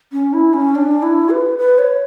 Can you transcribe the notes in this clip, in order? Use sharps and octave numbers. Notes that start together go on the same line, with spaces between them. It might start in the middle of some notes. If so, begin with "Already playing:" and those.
C#4
E4
C#4
D4
E4
B4
B4
C#5